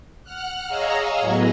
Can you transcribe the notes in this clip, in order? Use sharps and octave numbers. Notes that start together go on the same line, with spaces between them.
F#5 F6 F#6
G#4 C#5 D#5 F5 A#5 E6
A2 F#3 B3 G#4 D#5